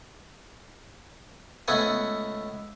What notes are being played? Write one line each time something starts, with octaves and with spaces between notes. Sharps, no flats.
C#2 A3 B3 F#5 G#5